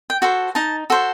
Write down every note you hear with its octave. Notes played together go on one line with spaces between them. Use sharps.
G5
F#4 A4 C5
D#4 A5
F#4 A4 C5